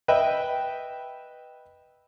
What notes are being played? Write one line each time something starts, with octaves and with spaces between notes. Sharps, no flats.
B4 D#5 E5 G5